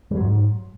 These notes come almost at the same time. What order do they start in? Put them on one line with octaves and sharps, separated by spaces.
G3 F#3 G#2